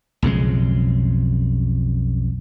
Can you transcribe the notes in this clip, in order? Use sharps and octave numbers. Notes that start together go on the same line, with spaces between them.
B1 F2 C#3 G#3